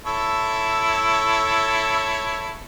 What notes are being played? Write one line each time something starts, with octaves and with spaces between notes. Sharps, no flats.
E4 A4 C#5